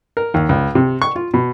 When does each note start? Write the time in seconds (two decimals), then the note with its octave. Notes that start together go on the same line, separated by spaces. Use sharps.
0.17 A#4
0.34 D#2
0.49 C#2
0.75 C3
1.02 C#6
1.16 F4
1.34 B2